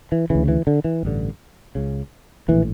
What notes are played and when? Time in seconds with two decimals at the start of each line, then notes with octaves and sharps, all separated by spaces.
0.12 E3
0.30 D2 C#3 E3
0.48 E3
0.67 D3
0.84 E3
1.03 A1 G2 D3
1.75 C#2 C#3
2.48 A#1 A2 E3